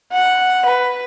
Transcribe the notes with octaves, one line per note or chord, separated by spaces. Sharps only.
F#5
B4